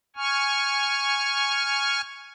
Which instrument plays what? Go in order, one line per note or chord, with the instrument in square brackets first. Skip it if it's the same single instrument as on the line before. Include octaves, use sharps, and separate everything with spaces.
[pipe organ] G#5 C#6 F6